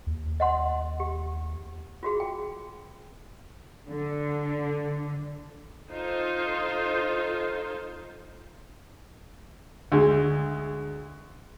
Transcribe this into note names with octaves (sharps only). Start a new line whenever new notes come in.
D#2
D#5 F#5 C6
G4
F4 F#4 G#4
G5
D3
D#4 F4 A4 C5
D2 G#3